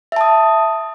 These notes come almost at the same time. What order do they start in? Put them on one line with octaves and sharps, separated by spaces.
E5 A5 D#6